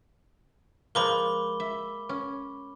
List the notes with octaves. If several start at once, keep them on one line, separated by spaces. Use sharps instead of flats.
F3 G#3 A#3 B5 D6 G7
E5
C#4